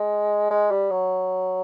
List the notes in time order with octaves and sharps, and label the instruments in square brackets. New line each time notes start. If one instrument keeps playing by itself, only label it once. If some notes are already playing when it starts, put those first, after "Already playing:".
Already playing: [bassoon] G#3
G#3
G3
F#3